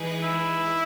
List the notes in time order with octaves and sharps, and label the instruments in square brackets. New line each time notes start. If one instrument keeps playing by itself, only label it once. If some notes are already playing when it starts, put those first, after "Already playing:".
Already playing: [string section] E3 G#3 D#4 G#4 B4
[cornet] E4